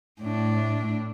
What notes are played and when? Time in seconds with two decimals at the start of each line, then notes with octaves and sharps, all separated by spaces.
0.21 A2 D4